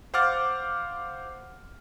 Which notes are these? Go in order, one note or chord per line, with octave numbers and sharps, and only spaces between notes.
C5 F5 F#5 D6 F6 A6